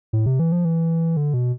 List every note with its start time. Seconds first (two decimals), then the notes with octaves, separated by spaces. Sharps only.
0.13 A2
0.26 C3
0.39 E3
0.52 F3
0.65 E3
1.17 D3
1.34 B2